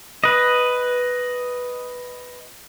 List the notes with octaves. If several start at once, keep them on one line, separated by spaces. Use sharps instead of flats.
B4 D#5